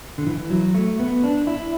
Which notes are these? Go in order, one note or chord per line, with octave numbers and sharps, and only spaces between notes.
D3
E3
F#3
A3
B3
D4
E4